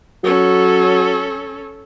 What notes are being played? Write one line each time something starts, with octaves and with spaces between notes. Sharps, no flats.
F#3 C#4 A4